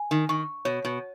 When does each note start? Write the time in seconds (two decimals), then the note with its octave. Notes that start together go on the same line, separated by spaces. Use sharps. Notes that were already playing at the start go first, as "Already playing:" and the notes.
Already playing: G#5
0.11 D#3
0.29 D#3 C#6
0.65 B2 C#5
0.85 B2